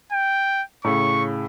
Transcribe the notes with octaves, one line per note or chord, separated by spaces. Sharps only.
G5
A2 C#3 C#6